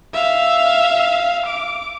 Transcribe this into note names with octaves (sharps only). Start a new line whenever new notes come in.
E5 F5
D6